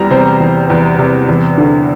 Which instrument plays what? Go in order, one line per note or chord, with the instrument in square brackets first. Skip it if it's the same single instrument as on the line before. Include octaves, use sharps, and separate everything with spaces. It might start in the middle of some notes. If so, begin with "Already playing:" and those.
Already playing: [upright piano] E2 G3 A#5
C3 C5
E2
E2
C3
E2
D3